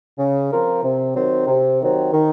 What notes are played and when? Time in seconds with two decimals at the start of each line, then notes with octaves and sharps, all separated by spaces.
0.18 C#3
0.51 F3 C4 F4 A#4
0.83 C3
1.16 D#3 F#3 C4
1.47 C3
1.80 D#3 F#3 C4
2.13 D#3